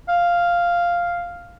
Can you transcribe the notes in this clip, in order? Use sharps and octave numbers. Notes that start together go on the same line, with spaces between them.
F5